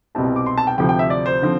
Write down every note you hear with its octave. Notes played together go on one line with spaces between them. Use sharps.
C2 B2 G3 C4 E4 A5
D6
C6
A5
G5
D2 C3 F3 G5
G5
E5
D5
C5
D3 F3 C4